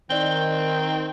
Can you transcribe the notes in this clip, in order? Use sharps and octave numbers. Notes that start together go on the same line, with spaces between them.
D#3 C4 D5 G7